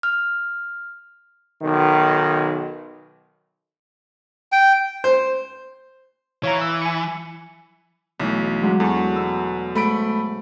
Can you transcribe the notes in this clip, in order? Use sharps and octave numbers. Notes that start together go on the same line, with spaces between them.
F6
B1 D#3
G5
C5
E3 C#5 F5 A#5
E6
G#5 C#7
B1 E3 A3
F#3 G#3 D4
E2 A4 A5 C#6
B2 E6
G#2 A3 B5 D7